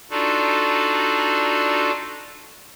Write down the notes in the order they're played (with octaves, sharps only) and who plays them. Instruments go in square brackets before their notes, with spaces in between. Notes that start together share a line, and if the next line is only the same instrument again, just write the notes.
[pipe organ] D4 D#4 F4 F#4 A4 D5